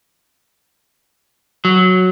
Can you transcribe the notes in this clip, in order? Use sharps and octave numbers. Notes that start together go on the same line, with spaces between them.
F#3